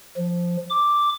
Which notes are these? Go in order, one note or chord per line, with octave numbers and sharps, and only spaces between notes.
F3
D6